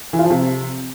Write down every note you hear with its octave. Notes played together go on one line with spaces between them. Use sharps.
E3
F4
F3
C3